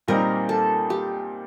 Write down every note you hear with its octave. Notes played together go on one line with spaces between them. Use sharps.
A#2 G3 C4 D#4 A#4
A4
G4